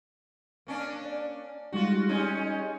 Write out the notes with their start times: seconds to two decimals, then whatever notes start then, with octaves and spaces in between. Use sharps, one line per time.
0.67 A#3 C#4 D4
1.05 D5
1.72 G3 G#3 D#4 F4 F#4
2.09 G3 G#3 C#4 D#4